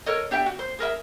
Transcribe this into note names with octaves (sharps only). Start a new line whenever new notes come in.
A4 A#4 C#5 D#5
D4 G4 E5 G5
F#4
C5
G#4 A#4 B4 E5